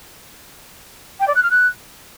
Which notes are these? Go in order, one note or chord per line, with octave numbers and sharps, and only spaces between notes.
G5
D5
F#6
F6
F#6